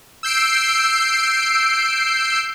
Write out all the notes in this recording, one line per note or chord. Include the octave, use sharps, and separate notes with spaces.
E6 G6 C7 D7